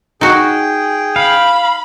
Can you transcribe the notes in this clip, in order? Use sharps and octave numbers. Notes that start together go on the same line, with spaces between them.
D#4 F#4 G#4 G5
F5 B5